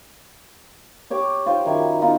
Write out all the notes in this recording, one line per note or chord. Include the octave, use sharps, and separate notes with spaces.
G4 C#5 D6
F4 C5 G5
F#2 D#3 E4 C#6
B3 D#4 F4